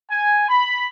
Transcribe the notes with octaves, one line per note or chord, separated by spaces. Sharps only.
G#5
B5